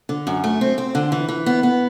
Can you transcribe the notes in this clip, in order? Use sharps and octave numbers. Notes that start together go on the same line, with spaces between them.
D3
F#2
A3
C4
C4
D3
E3
E3
B3
B3